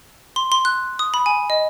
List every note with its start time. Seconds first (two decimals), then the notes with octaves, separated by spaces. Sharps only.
0.36 C6
0.52 C6
0.65 F#6
0.99 D#6
1.14 B5
1.26 G#5
1.50 D#5